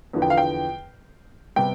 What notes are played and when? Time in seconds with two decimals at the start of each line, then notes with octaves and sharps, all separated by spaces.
0.13 E2 D3 F3 B3
0.22 G5
0.30 F5
0.38 G5
1.56 C3 G3 B3 G5